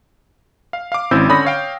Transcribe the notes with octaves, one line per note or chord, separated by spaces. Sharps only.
F5
F5 D6
G#1 C4 C#4 E4 E6 G6
D3 C#4 C#5 B5 D#6 A#6
C#5 F5 G5